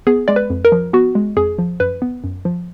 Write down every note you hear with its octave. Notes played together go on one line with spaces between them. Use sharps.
B3 G#4
G#3 D5
B4
F2
A#4
F3
B3 F#4
G#3
F2 G#4
F3
F#2 B4
B3
F#2
F3